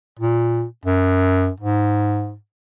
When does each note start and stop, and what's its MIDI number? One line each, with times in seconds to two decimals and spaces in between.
0.19 0.65 46
0.85 1.49 42
1.60 2.35 44